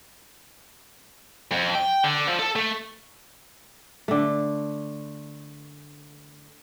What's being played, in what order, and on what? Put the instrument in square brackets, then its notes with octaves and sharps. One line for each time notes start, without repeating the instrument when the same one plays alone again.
[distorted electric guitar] F2
G5
D3
F3
A4
A3
[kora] D3 A3